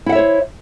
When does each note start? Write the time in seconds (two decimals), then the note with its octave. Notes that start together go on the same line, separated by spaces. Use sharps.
0.06 E4
0.09 F#5
0.12 E5
0.15 C#5
0.18 C5